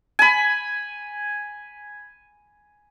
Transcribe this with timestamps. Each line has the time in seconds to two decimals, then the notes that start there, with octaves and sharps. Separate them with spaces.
0.19 G#5 B5